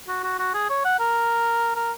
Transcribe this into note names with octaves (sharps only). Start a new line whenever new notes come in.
F#4
F#4
F#4
G#4
C#5
F#5
A#4
A#4